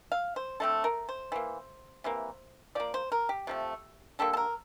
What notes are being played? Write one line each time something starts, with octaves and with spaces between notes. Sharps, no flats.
F5
C5
D3 A3 C4 A4
A#4
C5
E3 A#3
C3 E3 A#3
F3 A#3 D5
C5
A#4
G4
C3 F3 A3
D3 G3 A#3 A4
A4
A#4